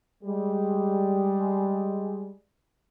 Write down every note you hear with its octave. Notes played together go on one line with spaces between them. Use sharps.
G3 G#3